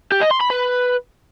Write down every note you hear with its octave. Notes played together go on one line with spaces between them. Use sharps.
G4
D#5
C6
B5
B4